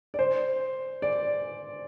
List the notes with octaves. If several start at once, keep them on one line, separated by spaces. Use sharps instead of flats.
D5
C5
D5